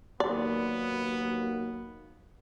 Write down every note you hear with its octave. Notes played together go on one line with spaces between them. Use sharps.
D#2 F#3 A#3 B3 D5